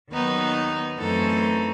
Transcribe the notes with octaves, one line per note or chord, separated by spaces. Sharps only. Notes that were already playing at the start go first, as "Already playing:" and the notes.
D#2 D#3 F#3 B3 D#4 B4
F#2 E3 A3 C4 D#4 A4